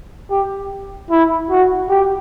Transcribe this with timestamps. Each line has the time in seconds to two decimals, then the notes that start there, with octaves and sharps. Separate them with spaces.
0.31 G4
1.10 E4
1.50 F#4
1.90 G4